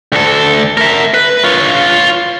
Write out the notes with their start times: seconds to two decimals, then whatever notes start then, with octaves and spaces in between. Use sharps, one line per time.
0.12 D2 A4
0.77 A#4 E5
1.14 B4
1.44 F4 C#5